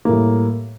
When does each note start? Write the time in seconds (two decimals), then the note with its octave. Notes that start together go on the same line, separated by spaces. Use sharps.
0.05 A#3
0.09 A2
0.12 G3